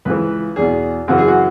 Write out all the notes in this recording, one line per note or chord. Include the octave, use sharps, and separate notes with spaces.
C#2 C#3 E3 B4
E2 B2 G#4
F#2 C#3 E3 F#4
G#4
F#4